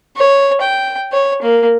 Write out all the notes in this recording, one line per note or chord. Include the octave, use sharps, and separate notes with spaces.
C#5
G5
C#5
A#3